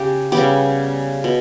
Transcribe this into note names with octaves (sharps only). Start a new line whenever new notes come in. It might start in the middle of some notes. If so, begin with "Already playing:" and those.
Already playing: C#3 G4
C#3 G3 B3 G4
B2